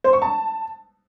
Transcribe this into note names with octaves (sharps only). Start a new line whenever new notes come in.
C5
C#6
A5